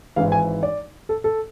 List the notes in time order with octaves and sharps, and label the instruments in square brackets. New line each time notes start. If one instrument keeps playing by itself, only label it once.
[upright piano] G#1 G#2 E3 F5
G#5
D5
A4
A4